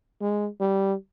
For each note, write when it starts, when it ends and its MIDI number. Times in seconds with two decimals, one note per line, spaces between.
0.21 0.47 56
0.60 0.94 55